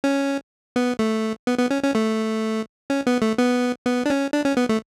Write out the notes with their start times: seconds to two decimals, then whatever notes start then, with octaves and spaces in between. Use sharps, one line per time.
0.04 C#4
0.76 B3
0.99 A3
1.47 B3
1.58 B3
1.70 C#4
1.83 C#4
1.95 A3
2.90 C#4
3.07 B3
3.22 A3
3.38 B3
3.86 B3
4.06 D4
4.10 C#4
4.33 D4
4.45 C#4
4.57 B3
4.69 A3